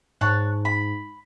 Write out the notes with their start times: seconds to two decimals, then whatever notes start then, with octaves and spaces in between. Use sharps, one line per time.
0.21 G#2 C#5 A5 F#6
0.65 B5